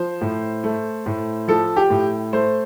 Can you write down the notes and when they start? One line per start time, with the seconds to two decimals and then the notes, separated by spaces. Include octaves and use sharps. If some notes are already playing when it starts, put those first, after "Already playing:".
Already playing: F3 C5
0.21 A2
0.64 A3
1.06 A2
1.48 F3 A4
1.76 G4
1.90 A2
2.33 A3 C5